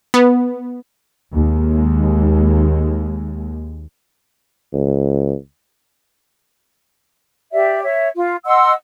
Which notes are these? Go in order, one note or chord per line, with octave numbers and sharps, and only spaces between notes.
B3
D#2 G#3
C#2
G4 D5 E5
C#5 E5
F4
D#5 F#5 C6 E6